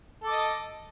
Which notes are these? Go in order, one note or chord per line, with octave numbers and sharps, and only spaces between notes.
A4 D#5 D6